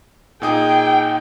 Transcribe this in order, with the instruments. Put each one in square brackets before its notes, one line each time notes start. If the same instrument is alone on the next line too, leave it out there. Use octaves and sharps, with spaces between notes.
[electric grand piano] A#2 D#4 D#6 [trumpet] G#4 [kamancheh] G5